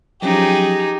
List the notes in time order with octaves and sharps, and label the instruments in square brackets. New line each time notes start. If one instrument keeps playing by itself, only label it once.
[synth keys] F3 F#3 C#4 [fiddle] D#4 [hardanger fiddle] G4 G#4